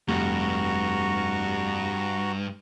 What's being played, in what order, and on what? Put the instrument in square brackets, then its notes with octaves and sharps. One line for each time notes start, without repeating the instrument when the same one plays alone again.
[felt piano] F1 [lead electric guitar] G2 [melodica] F#4 A#5 C#6